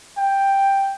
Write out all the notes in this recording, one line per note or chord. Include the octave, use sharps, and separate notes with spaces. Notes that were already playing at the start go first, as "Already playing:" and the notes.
G5